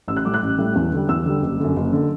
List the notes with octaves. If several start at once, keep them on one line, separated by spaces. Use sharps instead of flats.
A1 E6
F#6
A2 G3 D6
F#6
A1
A2 G3
E2
D3 G3
E2 E6
D3 G3
F#1
F#2 D3
F#1
D3